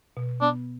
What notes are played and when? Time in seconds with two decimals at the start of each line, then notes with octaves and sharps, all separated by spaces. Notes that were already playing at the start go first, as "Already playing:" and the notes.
0.17 B2
0.41 B3 D4